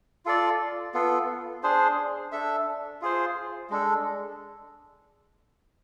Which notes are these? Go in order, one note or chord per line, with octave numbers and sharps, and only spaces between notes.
F4 A4 D5
B3 F4 A4
D4 G#4 C5
D4 A4 E5
F4 G#4 C5
G#3 D4 A4